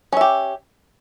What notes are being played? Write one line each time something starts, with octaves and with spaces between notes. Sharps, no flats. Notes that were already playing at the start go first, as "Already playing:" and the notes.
C#4 G4 E5